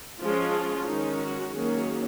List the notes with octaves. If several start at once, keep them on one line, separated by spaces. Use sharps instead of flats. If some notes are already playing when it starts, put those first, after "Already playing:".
F3 G#3 C#4 F4
D#3 G#3 C#4 D#4
F#4
D#3 F#3 A#3 C#4 G#4